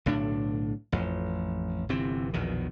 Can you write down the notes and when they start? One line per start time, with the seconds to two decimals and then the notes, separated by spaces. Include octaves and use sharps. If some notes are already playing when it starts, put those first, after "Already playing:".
0.06 B1 A2 D3 D4
0.92 A1 F2
1.89 G1 C3 E3 C4
2.33 A#1 E2 B2 D#3